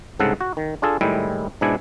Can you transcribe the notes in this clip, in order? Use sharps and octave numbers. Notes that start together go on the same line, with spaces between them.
C2 G#2 C#3 A4 F#5
F#4
D#3
D4 F4 G#4 A4
A2 D#3 G3 G#3 E4
G#2 B2 D4 E4 G#5